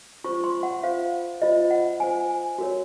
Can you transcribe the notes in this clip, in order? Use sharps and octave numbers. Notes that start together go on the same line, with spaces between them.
F4 C5 C#6
C6
F#5
F4 C5 F5
F4 C5 D#5
F#5
F4 C5 G#5
F#4 A#4 C#5